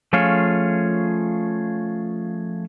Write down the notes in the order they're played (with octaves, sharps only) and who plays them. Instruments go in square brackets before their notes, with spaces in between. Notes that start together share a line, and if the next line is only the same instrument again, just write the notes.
[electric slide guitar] F3 A3 C#4 F4 G#4 C#5